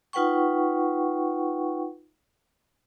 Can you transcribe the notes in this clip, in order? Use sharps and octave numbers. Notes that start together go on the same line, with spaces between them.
D#4 F4 B4 F#5 G5 C#6